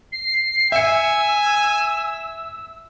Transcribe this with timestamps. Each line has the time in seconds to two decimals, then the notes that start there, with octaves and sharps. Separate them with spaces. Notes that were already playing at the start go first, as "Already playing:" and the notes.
0.12 C7
0.72 E5 G#5 E6 C#7